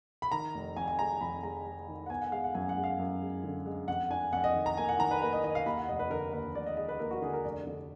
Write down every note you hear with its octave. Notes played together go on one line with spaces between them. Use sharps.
B5
D#3 A#5
F1
F2 G#5
G#5
G#3 A#5
F2 B5
G#3 A#5
G#3
D#3
F#5
B3 G#5
F#5
G#3 F5
F#5
F#2 G#5
F#5
G#3
F5
F#2
G#3
D3
G#3
F2 F#5
D4 G#5
F2 F#5
D#5
D#3
A#5
A#3 G#5
F#5
D#3 A#5
B4
A#3 B4
D#5
D#3 D#5
F5
D#2 B5
F#5
F1 D#5
B4
D3 A#4
D#2 B4
F1 D5
D#5
G#3 D#5
B4
D#2 A#4
F#4
D3 G#4
A#4
F1 D5
D3